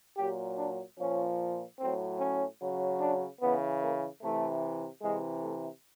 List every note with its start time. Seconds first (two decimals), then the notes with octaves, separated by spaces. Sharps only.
0.17 A#2 F#3 G4
0.58 D4
0.98 A#2 F3 C#4
1.79 A2 F#3 C4
2.19 C#4
2.60 C#3 F#3
3.00 D4
3.41 C#3 E3 B3
3.81 A#3
4.21 C3 E3 A3
5.02 C3 E3 G#3
5.42 A3